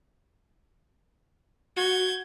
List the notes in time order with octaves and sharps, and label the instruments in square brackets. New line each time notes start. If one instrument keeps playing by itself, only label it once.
[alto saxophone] F#4 [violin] G6 G#6